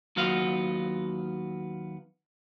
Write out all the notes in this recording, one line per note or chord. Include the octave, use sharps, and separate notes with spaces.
D#2 F#3 B3 F4 F#4 F5